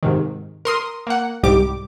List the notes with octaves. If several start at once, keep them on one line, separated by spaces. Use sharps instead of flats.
G#2 C3 D#3
A#4 C6 D#6
A#3 F#5
C2 G#2 G3 G4 D6